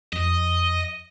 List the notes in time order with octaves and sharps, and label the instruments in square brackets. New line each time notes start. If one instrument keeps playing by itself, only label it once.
[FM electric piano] F2 [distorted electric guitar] D#5